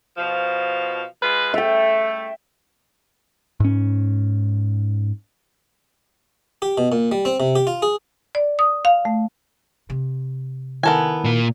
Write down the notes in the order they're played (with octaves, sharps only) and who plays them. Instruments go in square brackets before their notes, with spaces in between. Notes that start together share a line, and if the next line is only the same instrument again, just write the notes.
[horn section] B2 F3
G#3 F4 B4
[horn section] A3 [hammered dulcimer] E5 G5
[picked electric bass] G#2 C#4
[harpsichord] G4
B2
A#2
G3
C4
C3
G4
F4
G#4
[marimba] D5
D#6
F5
A3
[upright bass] C3
[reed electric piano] D#3 E4 A#4 [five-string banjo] B3 A4 G#5
[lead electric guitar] A#2 A#3